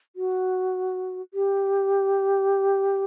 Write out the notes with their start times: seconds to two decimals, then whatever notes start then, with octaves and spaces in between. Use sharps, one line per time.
0.16 F#4
1.34 G4